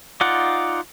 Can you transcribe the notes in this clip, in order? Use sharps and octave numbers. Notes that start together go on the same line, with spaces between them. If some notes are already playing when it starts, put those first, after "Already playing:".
D#4 F4 D5 F#5